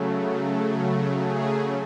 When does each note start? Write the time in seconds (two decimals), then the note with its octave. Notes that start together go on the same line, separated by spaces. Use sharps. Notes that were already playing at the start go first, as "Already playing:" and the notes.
Already playing: C#3 F#3 A3
1.26 G#4